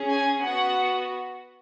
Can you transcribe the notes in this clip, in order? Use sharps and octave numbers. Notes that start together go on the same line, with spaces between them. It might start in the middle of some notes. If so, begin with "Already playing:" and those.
Already playing: C#4 G#4
G#5
B3 F#4 F#5